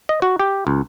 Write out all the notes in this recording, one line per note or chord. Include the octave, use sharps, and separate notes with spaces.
D#5
F#4
G4
C#2